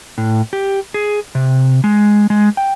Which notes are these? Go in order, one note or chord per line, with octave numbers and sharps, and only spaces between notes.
A2
G4
G#4
C3
G#3
G#3
G5